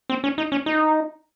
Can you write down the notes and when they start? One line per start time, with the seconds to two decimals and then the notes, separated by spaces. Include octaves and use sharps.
0.10 C4
0.24 C#4
0.38 D#4
0.52 C#4
0.66 D#4